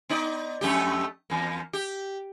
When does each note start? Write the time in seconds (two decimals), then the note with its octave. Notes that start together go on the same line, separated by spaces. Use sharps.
0.09 B3 D#4 D5
0.61 F2 A3 G4
1.30 E2 A#3
1.73 G4